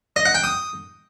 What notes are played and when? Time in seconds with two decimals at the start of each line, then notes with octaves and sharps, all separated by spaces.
0.16 D#5
0.25 F#5
0.35 G5
0.44 D#6